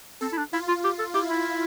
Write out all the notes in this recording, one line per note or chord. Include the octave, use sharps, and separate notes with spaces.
C4 A4
E4
D4
E4 F4
F4
G4
A4
E4 G4
E4